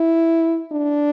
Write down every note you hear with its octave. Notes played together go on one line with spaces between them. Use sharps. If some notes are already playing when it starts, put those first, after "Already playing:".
Already playing: E4
D4